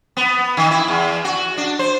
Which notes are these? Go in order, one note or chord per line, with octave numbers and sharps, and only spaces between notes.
B3
D#3
E4
E2
F#4
D4
C5